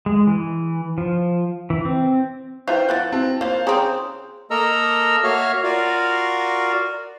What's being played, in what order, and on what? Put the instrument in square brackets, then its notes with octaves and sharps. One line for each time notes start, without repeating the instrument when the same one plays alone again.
[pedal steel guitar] G#3
E3
F3
E3
C4
[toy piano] C#4 E4 B4 [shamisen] F4 E5 F5 [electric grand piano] C5 G5
[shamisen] E3 F3 B3 [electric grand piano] F#6 A6
[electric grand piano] C4 [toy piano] E4 F#4 A5
[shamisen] A#3 F4 [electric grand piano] C5 F5
[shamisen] C#3 C4 C#4 [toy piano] G#4 A#5 D#6
[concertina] A#3 A4 A#4 D#5 A#5 E6
A#3 F#4 C#5 E5 F5 F6
F4 F#4 A#4 D5 F5